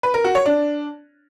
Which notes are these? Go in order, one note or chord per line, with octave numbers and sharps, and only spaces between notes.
B4
A#4
F#4
C#5
D4